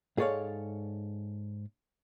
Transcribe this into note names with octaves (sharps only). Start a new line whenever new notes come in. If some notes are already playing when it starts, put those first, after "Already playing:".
G#2 G#4 A4 C#5 D5 F5